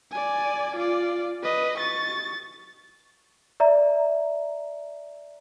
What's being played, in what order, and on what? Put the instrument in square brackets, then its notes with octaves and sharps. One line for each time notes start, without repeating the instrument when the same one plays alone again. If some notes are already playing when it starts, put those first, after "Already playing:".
[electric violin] D5 G#5
F4 D5
B4 D#5
C#6 A6
[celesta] D5 E5 A#5